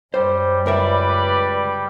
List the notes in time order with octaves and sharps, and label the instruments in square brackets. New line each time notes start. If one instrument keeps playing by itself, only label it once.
[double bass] F#2 [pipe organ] G3 [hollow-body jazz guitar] C5
[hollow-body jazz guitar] C#2 A#4 E5 [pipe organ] G3 [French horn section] B4 D5